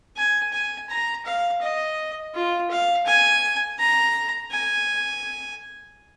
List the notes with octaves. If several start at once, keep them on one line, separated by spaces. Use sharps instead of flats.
G#5
G#5
A#5
F5
D#5
F4
F5
G#5
A#5
G#5